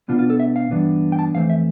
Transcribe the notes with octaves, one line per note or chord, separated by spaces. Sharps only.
B2 B3 D4 F4
F4
A4
E5
F5
G2 E3 B3 D4
G5
A5
F2 E3 A3 C4 F5
E5